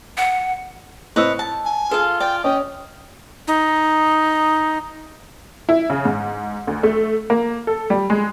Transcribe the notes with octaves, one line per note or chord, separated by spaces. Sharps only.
F#5
A2 C4 B4 C#5 D#5 E6
A5
G#5
F4 G#4 A4 F5
D5 G5
C#4 D#5 G5
D#4
E4
C#3
G#2
D2
A3
A#3
A4
G3
G#3